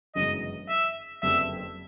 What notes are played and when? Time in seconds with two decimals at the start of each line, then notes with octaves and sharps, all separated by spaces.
0.15 G1 F#2 C#3 E3 G#3 D#5
0.69 E5
1.22 F#1 F2 D3 G3 B3 E5